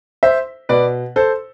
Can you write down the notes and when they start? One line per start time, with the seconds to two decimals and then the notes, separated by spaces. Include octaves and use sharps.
0.23 C5 E5
0.69 B2 B4 D5
1.16 A4 C5